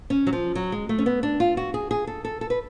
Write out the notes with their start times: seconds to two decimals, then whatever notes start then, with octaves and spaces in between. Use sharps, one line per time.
0.10 C#4
0.27 F#3
0.33 F3
0.55 F#3
0.72 G#3
0.89 A3
0.99 C#4
1.06 B3
1.23 D4
1.40 F4
1.57 F#4
1.74 G#4
1.91 G#4
2.07 A4
2.25 A4
2.41 A4
2.50 B4